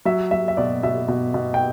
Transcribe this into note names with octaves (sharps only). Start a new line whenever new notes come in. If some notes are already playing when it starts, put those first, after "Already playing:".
F#3 E5
F#3 E5
E5
B2 D5
B2 E5
B2
B2
G5